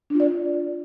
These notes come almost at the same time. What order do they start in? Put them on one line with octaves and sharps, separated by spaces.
D4 F4 D5